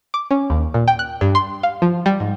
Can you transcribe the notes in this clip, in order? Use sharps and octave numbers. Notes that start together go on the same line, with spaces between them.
D6
C#4
D#2
A#2
G5
F#6
G2
C6
F5
F3
G3
G#2